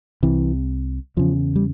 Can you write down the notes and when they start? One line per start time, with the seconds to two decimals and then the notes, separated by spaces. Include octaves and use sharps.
0.23 C2 C3 E3
1.17 E2 C#3 F3
1.56 G3